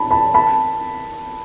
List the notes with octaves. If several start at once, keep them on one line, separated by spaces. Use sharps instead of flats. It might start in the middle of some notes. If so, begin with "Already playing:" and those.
Already playing: A5 B5
A5 B5
A5 B5